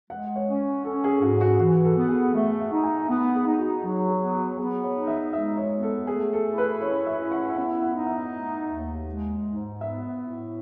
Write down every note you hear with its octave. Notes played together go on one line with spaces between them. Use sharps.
G#3 F#5
C#5
C#4
C#4 A4
G#4
G#2 F#4
F#4
E3 F#4
A4
B3
G#4
A3 E5
F#5
D#4
G#5
B3 F#5
G#4
D#4
F#4
F#3 G#4
G#4
B3
F#4
B3 G#4
C#5
D#4
E5
G#3 E5
C#5
B3
A4
A3 G#4
A4
E4
B4
C#4 C#5
E5
E4
F#5
B3 F#5
F#5
D#4
E5
A3
D#2
G#3
G#2
B3 E5
A2